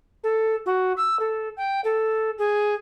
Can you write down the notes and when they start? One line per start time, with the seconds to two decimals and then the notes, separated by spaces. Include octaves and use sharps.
0.23 A4
0.65 F#4
0.97 E6
1.19 A4
1.57 G5
1.84 A4
2.38 G#4